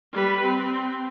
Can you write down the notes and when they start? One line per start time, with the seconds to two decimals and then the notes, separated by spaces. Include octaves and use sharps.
0.13 G3 B4
0.45 C4